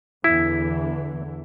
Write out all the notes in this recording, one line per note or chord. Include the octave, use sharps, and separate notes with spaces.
E2 D3 E3 E4